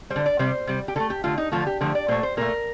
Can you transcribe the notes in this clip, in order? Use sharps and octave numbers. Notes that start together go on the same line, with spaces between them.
G3 C5
D3
D5
C3 G3 C5
C3 G3
G4
D3 A3 A4
G4
D3 A3 F4
D#4
D3 F3 A3 F4
G4
D3 F3 A3
D5
A#2 A3 C5
C5
A#2 A3 A#4